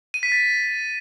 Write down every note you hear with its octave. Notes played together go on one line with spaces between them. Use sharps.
D#7
B6
A6